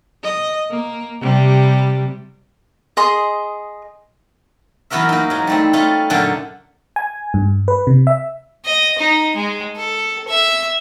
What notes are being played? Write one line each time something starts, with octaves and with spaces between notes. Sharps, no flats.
D#5
A#3
C3 G3
G#4 D#5 C6 D#6
F#2 E3 B3 F#4 A#4 E5
A#3 D#4
G#2 F#3
G3 A3 C4
G3 A3 C#4 F4
F#2 A#2 D3 A3 F#5 G5
G#5
G2
B4
C3
E5
D#5
D#4
G#3
A4
E5